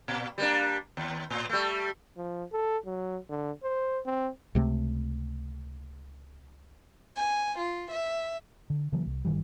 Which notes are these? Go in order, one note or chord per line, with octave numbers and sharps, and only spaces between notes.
A#2
G3 A#3 D4
D#2
A2
G3 A3
F3
A4
F#3
D3
C5
C4
C#2 C3 A3
G#5
F4
E5
D3
C#3 E3 F#3 A#3
C2
G1 D#3 E3 G3